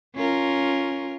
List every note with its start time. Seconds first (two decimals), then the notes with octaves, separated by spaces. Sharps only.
0.15 C#4 F4 A#4